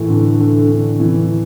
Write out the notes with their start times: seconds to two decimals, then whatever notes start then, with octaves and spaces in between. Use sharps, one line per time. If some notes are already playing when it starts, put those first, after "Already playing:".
Already playing: A2 E3 A3
0.09 D3
0.40 D3
0.69 D3
1.00 E3